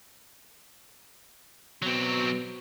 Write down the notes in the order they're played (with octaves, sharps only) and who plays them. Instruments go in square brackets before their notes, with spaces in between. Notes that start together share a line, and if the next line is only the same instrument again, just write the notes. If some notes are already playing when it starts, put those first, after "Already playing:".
[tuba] B2 [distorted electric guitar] F#3 C4